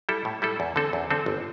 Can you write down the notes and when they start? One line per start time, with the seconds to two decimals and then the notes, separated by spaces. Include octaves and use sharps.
0.09 G3 E4 A4
0.25 A2
0.42 G3 E4 A4
0.60 E2
0.76 D3 C4 A4
0.93 E2
1.10 D3 C4 A4
1.26 G1